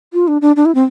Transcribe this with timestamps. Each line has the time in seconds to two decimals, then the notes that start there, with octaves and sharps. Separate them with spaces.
0.13 F4
0.28 D4
0.42 D4
0.56 D4
0.66 E4
0.75 C4